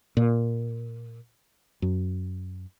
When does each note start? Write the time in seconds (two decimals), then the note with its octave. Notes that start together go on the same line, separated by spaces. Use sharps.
0.17 A#2
1.82 F#2